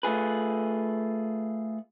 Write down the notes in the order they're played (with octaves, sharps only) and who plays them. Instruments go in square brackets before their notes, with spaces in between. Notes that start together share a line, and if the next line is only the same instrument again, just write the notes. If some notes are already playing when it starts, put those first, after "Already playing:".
[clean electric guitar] A3 F4 G#4 B4